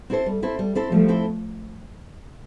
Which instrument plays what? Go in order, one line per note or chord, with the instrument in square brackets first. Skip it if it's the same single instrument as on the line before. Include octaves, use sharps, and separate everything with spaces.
[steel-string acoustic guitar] C4 E4 A4 C5
G3
C4 E4 A4 C5
G3
C4 E4 A4 C5
[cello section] F3 A3 [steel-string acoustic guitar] G3
[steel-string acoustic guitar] C4 E4 A4 C5